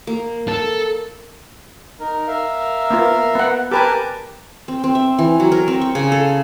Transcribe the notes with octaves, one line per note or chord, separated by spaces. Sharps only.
A#3
A4
D#4 A#4
A#4 E5 F5
A#3 B3 F4
B3 F#5
G4 A#4 B4 G#5 A5 D6
C4
C4
E5
E3
F#3
A#4
C4
C#6
C#3
A4